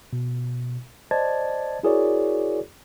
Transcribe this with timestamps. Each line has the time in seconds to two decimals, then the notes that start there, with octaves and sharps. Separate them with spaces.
0.13 B2
1.11 C5 D5 D#5 A5 G#6 A6
1.83 E4 F#4 G#4 A#4 C#5 D5